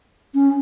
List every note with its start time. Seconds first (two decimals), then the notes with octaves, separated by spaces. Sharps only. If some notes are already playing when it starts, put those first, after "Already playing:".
0.35 C#4